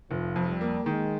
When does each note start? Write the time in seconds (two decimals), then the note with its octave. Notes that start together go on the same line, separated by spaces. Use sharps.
0.10 F1 F3
0.36 F2
0.48 G3
0.61 A#3
0.85 D#3 G#3